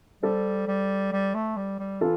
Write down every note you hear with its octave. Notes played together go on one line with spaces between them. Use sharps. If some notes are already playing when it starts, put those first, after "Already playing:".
G3 A4 C5
G3
G3
A3
G3
G3
E3 F4 A4